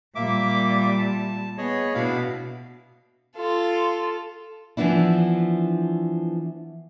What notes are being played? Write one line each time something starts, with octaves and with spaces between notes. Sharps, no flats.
A#2 G3 A#3 E5 D6
A5
B3 G#4 C#5 D#5
B2 B3 D4 E4 F5
F4 A4
E3 F3 B3 D4 E4